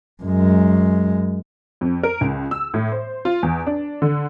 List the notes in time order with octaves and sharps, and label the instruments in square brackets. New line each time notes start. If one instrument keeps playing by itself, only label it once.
[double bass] F#2 G#3
[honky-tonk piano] F2
A#4
C#2
E6
A2
C5
F4
E2
D4
D3